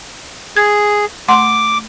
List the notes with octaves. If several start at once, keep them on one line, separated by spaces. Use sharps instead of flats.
G#4 G#6
A3 F#5 C6 D6